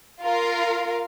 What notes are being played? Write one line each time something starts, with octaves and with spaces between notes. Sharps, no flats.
F4 A#4 F5